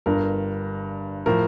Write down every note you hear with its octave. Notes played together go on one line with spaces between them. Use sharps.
G1 G2 D3 A#4
A2 F3 A#4